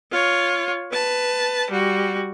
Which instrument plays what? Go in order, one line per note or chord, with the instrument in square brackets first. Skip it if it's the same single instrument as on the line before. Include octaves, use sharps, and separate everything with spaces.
[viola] F4 C#5
B4 A5
G3 F#4